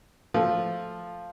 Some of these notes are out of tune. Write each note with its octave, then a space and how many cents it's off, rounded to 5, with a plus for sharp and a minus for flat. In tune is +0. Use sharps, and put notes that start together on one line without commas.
F3 +0 A3 +0